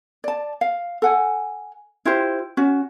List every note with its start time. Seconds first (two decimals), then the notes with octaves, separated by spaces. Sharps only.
0.24 D5 A5
0.61 F5
1.02 A4 F#5 G#5
2.05 E4 F4 G4 C5
2.57 C#4 F#4